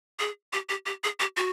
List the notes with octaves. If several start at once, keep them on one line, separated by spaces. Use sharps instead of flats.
G#4
G4
G4
G4
G#4
G4
F#4